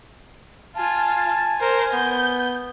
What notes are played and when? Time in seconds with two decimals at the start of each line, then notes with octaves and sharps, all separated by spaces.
0.77 F4 G#5 A5
1.61 A#4 C5
1.93 B3 G6